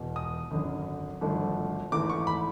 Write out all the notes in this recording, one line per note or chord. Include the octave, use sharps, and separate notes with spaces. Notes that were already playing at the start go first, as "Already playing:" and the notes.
Already playing: E1 E2 B2
D#6
G#1 F#2 D3
G#1 G2 D3 F3 A3
G#1 G#2 E3 A3 D6
C#6
B5